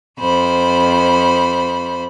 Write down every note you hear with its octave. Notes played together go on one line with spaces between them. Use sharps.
F2 C5 B5